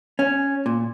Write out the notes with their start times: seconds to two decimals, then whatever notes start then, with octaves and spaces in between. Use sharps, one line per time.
0.19 C#4
0.66 A#2